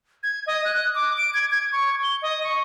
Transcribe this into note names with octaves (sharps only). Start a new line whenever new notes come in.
G#6
D#5
F#6
D6
D7
G#6
G#6
C#6
G7
D#5
C#6